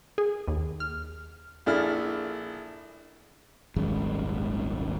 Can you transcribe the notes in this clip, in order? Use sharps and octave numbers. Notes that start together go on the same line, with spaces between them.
G#4
D#2
F6
A#1 D4 E4 G#4 A4 F6
D#1 G#1 F#2 G#3